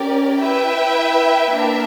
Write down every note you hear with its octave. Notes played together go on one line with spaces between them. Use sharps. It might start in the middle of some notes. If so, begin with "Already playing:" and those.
Already playing: C#4 G4 A#4 D5
E4 B4 E5 G5
A#3 D4 A#4 E5